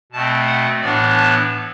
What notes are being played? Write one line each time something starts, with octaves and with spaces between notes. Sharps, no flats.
B2 A3 C4 A5
F#5
A2 E3 B3 D4 D5
A5